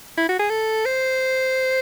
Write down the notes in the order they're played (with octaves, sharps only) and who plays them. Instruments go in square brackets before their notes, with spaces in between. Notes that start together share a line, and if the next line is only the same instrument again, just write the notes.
[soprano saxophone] E4
F#4
G#4
A4
C5